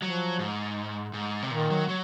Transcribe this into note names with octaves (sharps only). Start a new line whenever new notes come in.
F3 F#3
G#2
G#2
C3
A#2 D#3
F#3
F#3